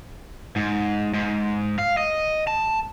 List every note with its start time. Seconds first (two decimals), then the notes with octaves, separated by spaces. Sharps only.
0.56 G#2
1.14 G#2
1.79 F5
1.97 D#5
2.47 A5